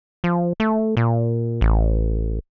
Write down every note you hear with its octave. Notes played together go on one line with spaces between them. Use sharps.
F3
A3
A#2
A1